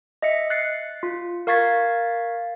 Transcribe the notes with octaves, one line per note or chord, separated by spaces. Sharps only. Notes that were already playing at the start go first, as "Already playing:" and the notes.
D#5 E5 C#7
F#6 A6 C7 C#7
F4
A#4 F5 C#6 G#6 A6 B6